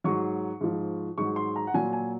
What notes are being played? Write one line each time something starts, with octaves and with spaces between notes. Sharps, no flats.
G#2 F#3 C#6
G#2 F3
G#2 F#3 C#6
C6
A#5
F#5
A#2 F#3 G#5
G#5